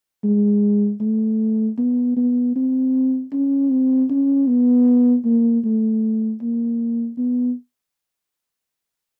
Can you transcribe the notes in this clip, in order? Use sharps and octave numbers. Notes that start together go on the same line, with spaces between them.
G#3
A3
B3
B3
C4
C#4
C4
C#4
B3
A#3
A3
A#3
B3